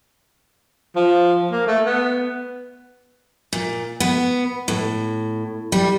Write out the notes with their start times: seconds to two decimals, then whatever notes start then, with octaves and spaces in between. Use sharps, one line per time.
0.96 F3
1.51 A#3
1.67 A3
1.86 B3
3.53 A#2
4.00 B3
4.68 A2
5.72 G3